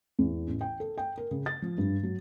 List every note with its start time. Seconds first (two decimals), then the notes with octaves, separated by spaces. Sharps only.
0.19 E2
0.47 A1
0.61 G5
0.80 A4
0.98 G5
1.18 A#4
1.31 C#3
1.46 A6
1.62 F3
1.78 G2
2.03 F#3